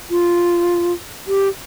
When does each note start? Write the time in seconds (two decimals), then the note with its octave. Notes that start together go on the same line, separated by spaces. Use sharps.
0.11 F4
1.28 G4